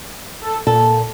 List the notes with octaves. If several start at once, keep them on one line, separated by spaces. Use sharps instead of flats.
A4
A#2 A4